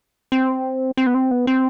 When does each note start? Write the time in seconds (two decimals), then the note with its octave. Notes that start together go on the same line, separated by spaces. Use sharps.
0.32 C4
0.97 C4
1.07 B3
1.14 C4
1.31 B3
1.47 C4